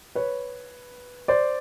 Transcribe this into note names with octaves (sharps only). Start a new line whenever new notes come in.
B4 C#5
C5 D5